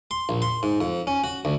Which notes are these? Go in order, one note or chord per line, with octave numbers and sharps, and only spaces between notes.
C6
A#1
C6
G#2
F2
C#4
F#4
D2